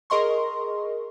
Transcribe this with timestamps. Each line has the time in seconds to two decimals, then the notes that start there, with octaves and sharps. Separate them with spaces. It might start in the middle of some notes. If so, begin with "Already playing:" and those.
0.10 G#4 A#4 D#5 C6 C#6